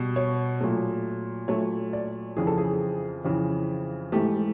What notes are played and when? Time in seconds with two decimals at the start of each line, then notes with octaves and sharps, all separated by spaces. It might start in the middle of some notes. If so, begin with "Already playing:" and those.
Already playing: B2 G3
0.16 C#5
0.61 A#2 F#3 A3
1.48 A#2 F#3 A3 C#5
1.93 D5
2.37 F2 C#3 E3 G#4
2.47 A4
2.58 G#4
3.25 F2 C#3 E3
4.12 G#2 E3 A3 G4